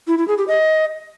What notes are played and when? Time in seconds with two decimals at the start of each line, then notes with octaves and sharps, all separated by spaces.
0.08 E4
0.18 E4
0.28 G#4
0.38 G4
0.48 D#5